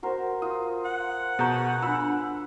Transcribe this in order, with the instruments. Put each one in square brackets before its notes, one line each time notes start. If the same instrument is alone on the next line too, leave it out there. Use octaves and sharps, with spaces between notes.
[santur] F#4 A#4 C5
[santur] F4 [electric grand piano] D#6
[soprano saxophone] F#5
[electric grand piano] B2 G6 [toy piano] G#4 A#5 C#6
[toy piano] D4 F4 [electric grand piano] B5 E6